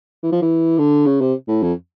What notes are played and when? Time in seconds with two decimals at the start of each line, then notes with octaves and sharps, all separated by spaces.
0.23 E3
0.32 F3
0.42 E3
0.79 D3
1.06 C#3
1.21 C3
1.48 A2
1.63 F2